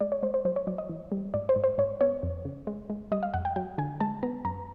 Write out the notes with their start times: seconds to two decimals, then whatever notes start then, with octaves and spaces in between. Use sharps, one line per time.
0.01 G#3 D5
0.12 C#5
0.23 G#3 C5
0.34 C5
0.45 F#3 C5
0.56 C#5
0.67 F#3 D5
0.78 D#5
0.89 E3
1.12 G3
1.34 G#2 D5
1.49 C5
1.56 G#2
1.64 C5
1.78 G#2 C#5
2.01 B3 C#5
2.23 F2
2.45 C#3
2.67 G#3
2.90 G#3
3.12 G3 D#5
3.23 F5
3.34 F2 F#5
3.45 G5
3.56 F#3 G5
3.78 D3 G#5
4.00 G#3 A5
4.23 B3 A#5
4.45 F#2 A#5